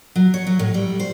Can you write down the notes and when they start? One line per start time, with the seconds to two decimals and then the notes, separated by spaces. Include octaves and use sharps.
0.16 F#3
0.34 C#5
0.47 F#3
0.59 A2
0.74 G3
1.00 C5